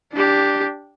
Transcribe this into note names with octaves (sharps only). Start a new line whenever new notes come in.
D4 G4